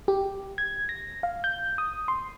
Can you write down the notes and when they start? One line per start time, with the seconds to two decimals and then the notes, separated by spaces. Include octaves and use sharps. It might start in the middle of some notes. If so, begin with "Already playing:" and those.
0.08 G4
0.58 G#6
0.89 A#6
1.23 F5
1.44 G6
1.78 D#6
2.08 C6